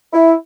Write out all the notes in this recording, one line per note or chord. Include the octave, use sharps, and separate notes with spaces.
E4